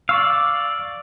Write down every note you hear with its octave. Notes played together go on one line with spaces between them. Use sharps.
D5 F5 C#6 E6